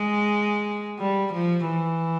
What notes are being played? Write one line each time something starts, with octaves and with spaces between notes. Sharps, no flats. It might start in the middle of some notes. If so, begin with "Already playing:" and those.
Already playing: G#3
G3
F3
E3